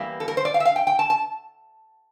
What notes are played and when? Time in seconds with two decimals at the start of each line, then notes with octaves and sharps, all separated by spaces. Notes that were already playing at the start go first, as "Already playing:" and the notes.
Already playing: E2 E3 G3 A#3
0.20 A4
0.28 A#4
0.37 C5
0.45 D5
0.54 F5
0.60 E5
0.65 F5
0.76 G5
0.87 G5
0.99 A5
1.10 A5